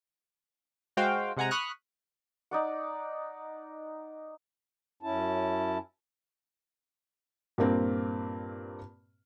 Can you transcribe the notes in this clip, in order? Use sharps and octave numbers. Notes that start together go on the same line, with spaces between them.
G#3 F#4 C5 F5 G5
C3 G#3 F#5 G#5 A#5
B5 C#6 D#6 F6 F#6
D#4 D5 F#5
F#2 C#4 E4 A5
G2 A#2 A#3 C4